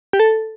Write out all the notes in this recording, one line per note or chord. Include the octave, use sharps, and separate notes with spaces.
G4
A4